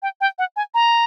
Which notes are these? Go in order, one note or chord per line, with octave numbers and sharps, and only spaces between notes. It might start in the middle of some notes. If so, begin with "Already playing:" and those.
G5
G5
F#5
G#5
A#5